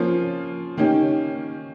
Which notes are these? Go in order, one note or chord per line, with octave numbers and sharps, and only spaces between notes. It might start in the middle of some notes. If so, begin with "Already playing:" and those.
Already playing: F3 A#3 C#4 F4
D#3 A#3 C#4 G4